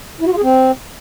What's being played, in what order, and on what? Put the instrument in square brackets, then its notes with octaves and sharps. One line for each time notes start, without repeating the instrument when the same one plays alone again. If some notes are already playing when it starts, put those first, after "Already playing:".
[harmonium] E4
F#4
F4
G#4
C4